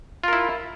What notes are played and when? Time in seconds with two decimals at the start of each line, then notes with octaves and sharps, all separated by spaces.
0.24 F4
0.28 A#4
0.33 E4